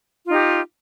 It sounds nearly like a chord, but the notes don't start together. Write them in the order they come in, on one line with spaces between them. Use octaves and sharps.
F4 D#4 G4